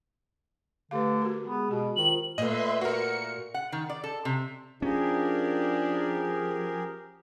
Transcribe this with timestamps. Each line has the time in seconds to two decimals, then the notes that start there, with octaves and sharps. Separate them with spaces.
0.91 D3 A3 G4 B4 F5 D6
1.22 F#4 A#4 A#5
1.45 G#3 B3 G#4
1.71 B2 G4
1.97 D#3 F4 C5 F#7
2.38 A#2 A3 B4 D#5 E5 C6
2.81 F#4 A#4 C#7
3.54 F#5
3.72 D#3
3.90 D5
4.04 A4
4.25 C3
4.82 F3 C#4 D4 G4 G#4 A#4